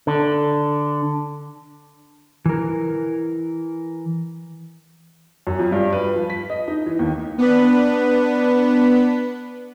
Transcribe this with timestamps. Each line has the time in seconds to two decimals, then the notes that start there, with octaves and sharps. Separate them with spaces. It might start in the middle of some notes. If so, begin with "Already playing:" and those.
0.07 D3
2.46 E3 A#4
5.47 F#2
5.59 F2
5.72 G2
5.93 B4
6.16 F3
6.30 B6
6.50 D#5
6.68 D#4
6.86 E3
6.99 D#2
7.38 B3 D4 B4